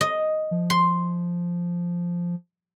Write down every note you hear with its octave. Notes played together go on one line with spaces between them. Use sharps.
D#5
F3
C6